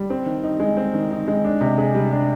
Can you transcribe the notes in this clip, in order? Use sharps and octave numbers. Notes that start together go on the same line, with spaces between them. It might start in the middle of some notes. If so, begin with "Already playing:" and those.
Already playing: G3
C4
D#3
D#4
G#3
C4
D#3
D#4
G#3
D4
C3
G#4
G3
D4